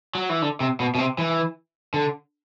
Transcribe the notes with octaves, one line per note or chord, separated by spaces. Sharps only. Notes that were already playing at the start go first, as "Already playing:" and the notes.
F#3
E3
D3
C3
B2
B2
C3
E3
D3